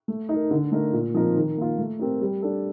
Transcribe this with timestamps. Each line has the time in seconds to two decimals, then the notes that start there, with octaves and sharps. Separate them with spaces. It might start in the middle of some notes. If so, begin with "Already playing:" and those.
0.08 A3
0.29 D#4 A#4
0.51 D3
0.72 A3 D#4 A#4
0.93 A#2
1.14 F3 C4 D#4 A#4
1.36 D#3
1.57 A#3 F4
1.78 A3
2.00 C4 G4 A#4
2.21 G3
2.42 D4 A4